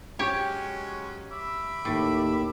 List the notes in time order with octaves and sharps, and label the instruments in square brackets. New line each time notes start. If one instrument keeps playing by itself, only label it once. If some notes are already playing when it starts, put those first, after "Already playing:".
[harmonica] F#3 G#3 C#4 [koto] G4 C#5
[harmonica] E5 B5 D6
[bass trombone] D#2 [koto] A2